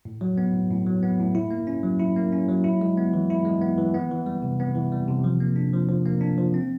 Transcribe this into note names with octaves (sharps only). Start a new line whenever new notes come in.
A2
F#3
B3
A2
A2
F#3
B3
A2
E4
A#3
C#4
F#3
E4
A#3
C#4
F#3
E4
G#3
B3
E3
E4
G#3
B3
E3
B3
E3
G3
C3
B3
E3
G3
C3
F3
A#3
D4
F3
F3
A#3
D4
F3
C4